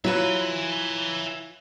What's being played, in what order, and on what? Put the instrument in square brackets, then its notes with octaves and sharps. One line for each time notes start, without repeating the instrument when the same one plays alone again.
[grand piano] F#3 [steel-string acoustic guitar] E4 F4 B4 [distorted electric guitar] E5 G#5